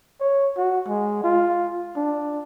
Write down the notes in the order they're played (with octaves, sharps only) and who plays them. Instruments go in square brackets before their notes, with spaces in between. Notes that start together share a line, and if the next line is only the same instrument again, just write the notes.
[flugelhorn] C#5
F#4
G#3
F4
D4